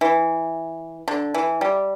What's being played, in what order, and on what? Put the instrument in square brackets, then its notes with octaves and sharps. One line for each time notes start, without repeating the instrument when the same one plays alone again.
[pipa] E3
D3
E3
G3